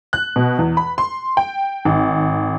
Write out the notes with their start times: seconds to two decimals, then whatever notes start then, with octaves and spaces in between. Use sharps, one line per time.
0.13 F#6
0.36 B2
0.59 E2
0.77 B5
0.98 C6
1.37 G5
1.85 G#1